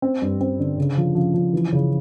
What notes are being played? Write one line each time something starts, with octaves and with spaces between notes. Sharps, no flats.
C4
G2
C4
D3
C#3
F3
F3
F3
E3
C#3